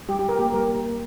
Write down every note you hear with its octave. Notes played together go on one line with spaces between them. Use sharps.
G3 G4
G4
G3 A#4
A#3 G4
G3 A#4
A#3
A#3